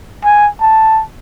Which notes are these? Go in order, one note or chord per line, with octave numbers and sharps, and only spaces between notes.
G#5
A5